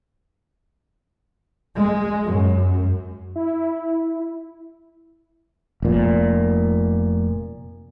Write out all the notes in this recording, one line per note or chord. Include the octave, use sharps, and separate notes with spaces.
G#3
F#2
E4
F1 A#2